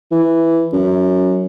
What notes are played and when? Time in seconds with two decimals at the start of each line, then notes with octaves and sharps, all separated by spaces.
0.12 E3
0.73 F#2